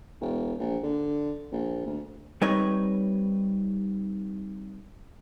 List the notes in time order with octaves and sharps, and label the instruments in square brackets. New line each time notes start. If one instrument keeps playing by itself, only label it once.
[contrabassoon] E1
A#1
D3
A#1
D2
[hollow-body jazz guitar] G3 C4 D#4 B4 C#5